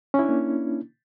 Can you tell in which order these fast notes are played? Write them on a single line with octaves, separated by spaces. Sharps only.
C#4 E4 D4 A#3